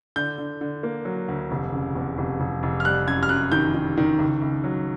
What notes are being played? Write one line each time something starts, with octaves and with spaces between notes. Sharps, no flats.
D3 G6
D3
D3
A#3
F#3
D2
F1
C#3
E2
F1
F1
F1
F6
G3 F#6
F#2 G#6
F6
F#2 F#6
D#3 G6
D#3
D#3
C#2
C#2
F#3